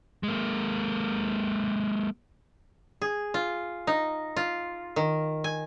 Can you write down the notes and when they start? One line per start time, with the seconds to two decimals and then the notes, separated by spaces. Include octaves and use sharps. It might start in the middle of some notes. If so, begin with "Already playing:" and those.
0.23 G#3 A#3
3.02 G#4
3.34 F4
3.87 D#4
4.36 F4
4.96 D#3
5.44 G#5